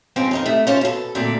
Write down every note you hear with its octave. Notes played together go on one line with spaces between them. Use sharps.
G#2 F3 C4 C#4
F2 D#4 A#4
C3 A3
C#4 F4 C5 C#5 A5
B2 A4
D2 A#2 C4 D4 A4